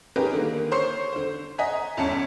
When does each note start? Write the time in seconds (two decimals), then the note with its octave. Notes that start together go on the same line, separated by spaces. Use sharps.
0.16 C#4 D#4 G4 G#4 A#4 B4
0.33 D3 D#3 A#3
0.72 C5 C#5 C6 C#6 C7
1.13 D3 C5
1.58 D#5 F#5 G#5 A#5 B6
1.97 G1 E2 C#4 A5 C#7